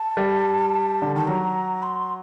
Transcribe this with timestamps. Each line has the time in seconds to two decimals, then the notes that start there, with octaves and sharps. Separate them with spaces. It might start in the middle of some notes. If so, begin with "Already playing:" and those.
Already playing: A5
0.17 G3
1.02 D3
1.15 D#3 A5
1.28 F#3 A#5
1.83 C6